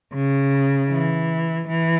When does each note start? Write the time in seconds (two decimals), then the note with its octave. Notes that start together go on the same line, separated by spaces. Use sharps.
0.14 C#3
0.90 E3
1.68 E3